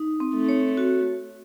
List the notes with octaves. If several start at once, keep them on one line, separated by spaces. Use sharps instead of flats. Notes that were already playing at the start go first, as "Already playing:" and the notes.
Already playing: D#4
C4
A3
C#5
F#4